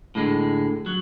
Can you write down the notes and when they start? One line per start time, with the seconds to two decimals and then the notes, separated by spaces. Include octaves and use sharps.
0.15 A2 D3 G#3
0.86 F#3